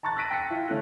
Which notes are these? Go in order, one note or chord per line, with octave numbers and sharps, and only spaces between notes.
A5 A#5 C#6 F#6 A6
E6 F#6 A#6 B6 D7 D#7
G5 A#6 B6 C#7
E4 F4
D3 A3 C#4 E4 A4 F#6